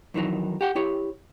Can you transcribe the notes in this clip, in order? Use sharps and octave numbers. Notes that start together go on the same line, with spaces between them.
F2 D#3 E3 F#3 D#4
G4 F#5 G5
E4 G4 C#5